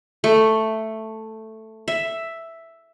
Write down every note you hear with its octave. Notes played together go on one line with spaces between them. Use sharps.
A3
E5